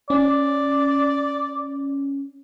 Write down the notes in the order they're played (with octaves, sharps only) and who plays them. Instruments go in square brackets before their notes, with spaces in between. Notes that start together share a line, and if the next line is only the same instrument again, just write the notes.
[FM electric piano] C#4 [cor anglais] D5